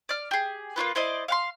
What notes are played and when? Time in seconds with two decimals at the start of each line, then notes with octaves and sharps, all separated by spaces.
0.09 D5 F6
0.31 G4 G#4
0.76 A#3 D4 F4 B4
0.95 E4 C5 D5 D#5
1.28 F5 F#5 C6